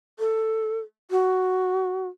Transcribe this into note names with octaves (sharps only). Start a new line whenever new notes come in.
A4
F#4